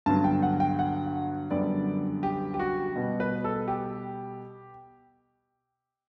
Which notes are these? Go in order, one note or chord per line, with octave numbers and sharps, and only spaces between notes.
G2 D3 F#3 B3 A5
G5
F#5
G5
F#5
F#2 D3 G3 B3 D5
G4
G4
F#4
B2 G3 B3
B4
A4
G4